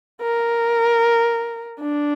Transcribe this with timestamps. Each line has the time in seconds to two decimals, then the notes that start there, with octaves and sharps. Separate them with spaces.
0.21 A#4
1.81 D4